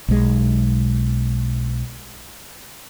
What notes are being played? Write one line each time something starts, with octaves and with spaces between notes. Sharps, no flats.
B1 G#3